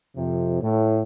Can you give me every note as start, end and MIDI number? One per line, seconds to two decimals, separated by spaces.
0.16 0.62 41
0.16 0.62 48
0.62 1.02 45